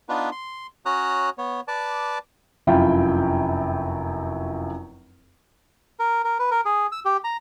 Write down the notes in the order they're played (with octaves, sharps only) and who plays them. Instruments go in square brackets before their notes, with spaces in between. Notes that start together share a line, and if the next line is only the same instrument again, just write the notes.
[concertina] B3 D4 D#4 F4 B4
C6
C#4 F#4 C#5 A#5 D#6 F#6
B3 C#5
B4 D5 A5 D6
[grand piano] F1 F#2 E4 F4 G5
[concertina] A#4
A#4
B4
A#4
G#4
E6
G4
A#5